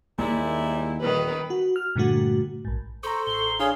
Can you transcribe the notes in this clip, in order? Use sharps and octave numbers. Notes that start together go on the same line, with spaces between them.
D#2 G#2 G3 A#3 E4
D#1 D#3 B4
F#4
F6
G2 A#2 D3 A3 F#4
A#1 G#2
A4 C5 A#5 C#6
A1 C7 G7
D4 G#4 C#5 F5